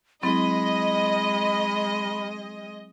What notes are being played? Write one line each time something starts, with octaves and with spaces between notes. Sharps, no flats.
F#3 G#3 C4 E4 D#5 B5